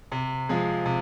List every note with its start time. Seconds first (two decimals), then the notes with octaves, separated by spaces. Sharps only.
0.12 C3
0.49 F3 G#3
0.85 C3